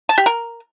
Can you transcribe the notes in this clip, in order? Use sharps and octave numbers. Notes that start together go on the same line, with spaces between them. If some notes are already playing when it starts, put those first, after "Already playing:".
A5
G4
A#4